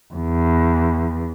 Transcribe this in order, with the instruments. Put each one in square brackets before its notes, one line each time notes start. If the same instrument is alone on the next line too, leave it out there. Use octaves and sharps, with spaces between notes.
[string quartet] E2